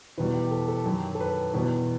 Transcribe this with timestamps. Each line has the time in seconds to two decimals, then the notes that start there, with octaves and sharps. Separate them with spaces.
0.18 E2 B2 G3 B4
0.34 G4
0.51 A4
0.68 A4
0.86 F#2 D#3 F#3 G4
1.15 A4
1.20 B4
1.54 E2 B2 G3 B4